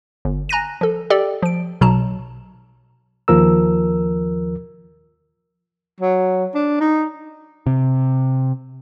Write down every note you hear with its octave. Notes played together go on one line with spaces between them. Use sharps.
G1
G#5 A#5 F#6 A#6 D#7
F3 A4
G4 A4 D5 G5
F3 D7
B1 B2 F#3 A5 A#5 E7
D#2 F3 A#4 E6
F#3
D4
D#4
C3